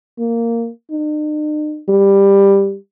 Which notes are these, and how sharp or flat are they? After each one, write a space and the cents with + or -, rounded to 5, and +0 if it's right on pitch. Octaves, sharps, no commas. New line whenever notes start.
A#3 -10
D#4 -45
G3 +10